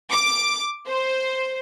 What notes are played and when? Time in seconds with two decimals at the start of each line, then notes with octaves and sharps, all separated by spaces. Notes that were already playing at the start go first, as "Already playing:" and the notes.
0.11 D6
0.88 C5